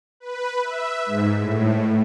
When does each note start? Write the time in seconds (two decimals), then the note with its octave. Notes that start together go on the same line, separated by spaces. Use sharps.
0.20 B4
0.63 E5
1.06 G#2
1.41 A2